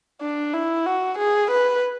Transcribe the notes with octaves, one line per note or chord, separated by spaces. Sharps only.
D4
E4
F#4
G#4
B4